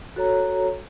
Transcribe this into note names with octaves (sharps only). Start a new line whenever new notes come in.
F#4 A4 C#5 A#5